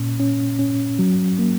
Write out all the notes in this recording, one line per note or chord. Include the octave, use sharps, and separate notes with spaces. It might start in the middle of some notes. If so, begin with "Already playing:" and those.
Already playing: A#2 C#4
C#4
C#4
F#3
A#3